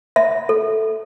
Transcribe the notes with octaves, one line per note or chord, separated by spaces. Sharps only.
E5
A4